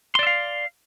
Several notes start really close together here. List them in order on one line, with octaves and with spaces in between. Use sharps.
C6 D5 E5 F5